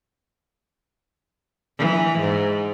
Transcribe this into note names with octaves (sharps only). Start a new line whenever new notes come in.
E3
G#2